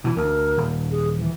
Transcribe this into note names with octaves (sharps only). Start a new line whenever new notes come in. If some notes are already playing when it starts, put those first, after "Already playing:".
B2 E3 E4
D2 A#4
D#1
G#4
E3